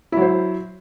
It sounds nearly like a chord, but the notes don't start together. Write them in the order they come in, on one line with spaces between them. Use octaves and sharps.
E4 F#3 C5